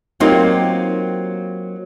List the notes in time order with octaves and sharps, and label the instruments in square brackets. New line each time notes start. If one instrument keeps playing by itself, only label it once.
[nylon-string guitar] F#3 A#3 C4 D#4 F4 G4